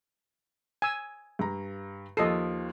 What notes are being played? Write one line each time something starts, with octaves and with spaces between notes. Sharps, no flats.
G#5 E6
G2 A#5
D#2 F3 A4 D#5 C7